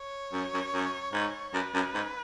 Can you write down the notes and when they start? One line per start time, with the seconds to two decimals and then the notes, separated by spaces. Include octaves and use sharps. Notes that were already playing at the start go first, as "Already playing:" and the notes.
Already playing: C#5
0.33 F#2
0.54 F#2
0.73 F#2
1.13 G#2
1.53 F#2 B4
1.74 F#2
1.94 G#2